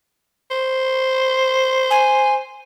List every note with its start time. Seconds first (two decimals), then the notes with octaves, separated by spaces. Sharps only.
0.51 C5
1.90 G#5